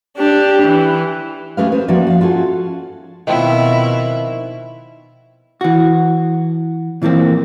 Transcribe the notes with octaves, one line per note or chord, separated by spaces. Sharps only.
D4 G4
E3
A3 C#4 G4 G#4 B4 F5
B4 C5
F3 A#3 C#4 F#4 D5 E5
F5 F#5
C#4 F4 F#4 G#4 A4
B2 D#3 F3 C4 E4
E3 F#4
A#2 E3 F3 A#3 C4